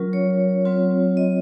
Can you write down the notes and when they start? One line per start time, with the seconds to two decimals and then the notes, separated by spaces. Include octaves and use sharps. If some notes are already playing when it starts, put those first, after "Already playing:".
Already playing: F#3 C#4 F4 A#4
0.13 C#5
0.65 F#3 C4 F4
1.17 D#5